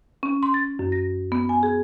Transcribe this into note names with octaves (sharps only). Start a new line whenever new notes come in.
C#4
C6
A6
F#2
A#6
B3
G#5
G#4